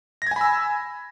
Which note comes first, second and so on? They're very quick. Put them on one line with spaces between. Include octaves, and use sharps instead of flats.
A#6 G#6 G#5 B5 E6